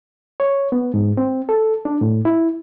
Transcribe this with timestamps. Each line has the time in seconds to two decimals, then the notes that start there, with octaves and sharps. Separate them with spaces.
0.40 C#5
0.72 B3
0.94 G#2
1.17 C4
1.49 A4
1.85 D4
2.01 A2
2.25 E4